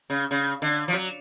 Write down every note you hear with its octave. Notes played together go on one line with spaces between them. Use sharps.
C#3
C#3
D3
F3
F#3